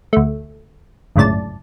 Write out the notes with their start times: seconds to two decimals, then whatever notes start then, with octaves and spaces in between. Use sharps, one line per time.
0.13 D2 A3
1.16 G1 C#2 F#2 A2 D5 A5